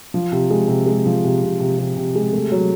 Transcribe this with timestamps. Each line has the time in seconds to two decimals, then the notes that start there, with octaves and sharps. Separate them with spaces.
0.14 F3
0.32 C3
0.51 G#3
0.68 C3
0.86 G#3
1.06 F3
1.24 C3
1.42 C3
1.60 C3
1.78 C3
1.97 C3
2.15 G#3
2.33 A3
2.52 F#3